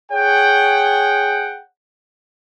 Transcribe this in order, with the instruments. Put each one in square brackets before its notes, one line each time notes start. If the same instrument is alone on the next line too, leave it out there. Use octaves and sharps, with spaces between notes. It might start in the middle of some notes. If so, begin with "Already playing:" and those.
[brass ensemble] G#4 C#5 F#5 G5